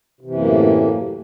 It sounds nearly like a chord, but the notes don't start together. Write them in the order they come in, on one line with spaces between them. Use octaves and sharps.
C3 E3 F#2 A#3 A2